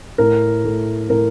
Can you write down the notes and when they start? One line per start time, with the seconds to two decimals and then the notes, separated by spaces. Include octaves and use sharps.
0.18 A2 A#4
0.64 A3
1.10 A2 A#4